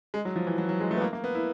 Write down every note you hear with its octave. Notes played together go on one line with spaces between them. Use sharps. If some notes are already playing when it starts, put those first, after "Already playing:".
G#3
F#3
F3
E3
F#3
F#3
G#3
A3
B3
A#3
A#3
B3
E4